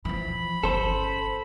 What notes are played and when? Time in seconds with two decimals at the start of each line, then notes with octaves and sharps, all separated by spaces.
0.05 E3 F3 B5
0.64 G1 C#4 A4 C5